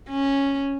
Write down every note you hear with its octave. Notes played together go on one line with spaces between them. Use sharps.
C#4